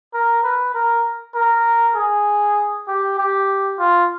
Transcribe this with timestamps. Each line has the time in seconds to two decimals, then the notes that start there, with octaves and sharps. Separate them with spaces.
0.14 A#4
0.44 B4
0.75 A#4
1.35 A#4
1.96 G#4
2.88 G4
3.18 G4
3.79 F4